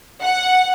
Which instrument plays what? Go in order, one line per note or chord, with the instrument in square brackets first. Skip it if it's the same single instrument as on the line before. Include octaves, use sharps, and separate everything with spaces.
[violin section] F#5